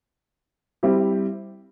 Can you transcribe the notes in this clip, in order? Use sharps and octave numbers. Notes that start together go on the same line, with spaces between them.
G3 C4 E4 G4